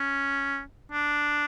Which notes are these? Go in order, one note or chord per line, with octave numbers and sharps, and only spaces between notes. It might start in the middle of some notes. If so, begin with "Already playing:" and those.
Already playing: C#4
D4